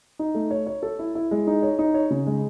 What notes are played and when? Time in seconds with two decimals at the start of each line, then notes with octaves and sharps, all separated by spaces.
0.19 D#4
0.35 A3
0.51 C#5
0.67 C#5
0.83 A4
0.99 E4
1.15 E4
1.31 G#3
1.47 D#4
1.63 C#5
1.79 D#4
1.94 C#5
2.11 C#3
2.26 G#3